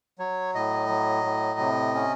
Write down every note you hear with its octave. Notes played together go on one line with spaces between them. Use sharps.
F#3 C#5
A2 D#5
F#3
A2
C3
C#4